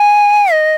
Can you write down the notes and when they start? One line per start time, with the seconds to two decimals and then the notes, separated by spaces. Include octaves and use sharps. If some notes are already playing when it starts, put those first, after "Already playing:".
Already playing: G#5
0.52 D#5